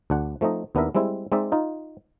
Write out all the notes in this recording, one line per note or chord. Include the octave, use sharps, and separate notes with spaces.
D2 D4 F#5
F3 A3 C4 D#4 D#5
D#2 B3 D4 E4 A#4 E5
G3 G#3 C4 E4
G#3 C4 D#4 D5 E5
D#4 F4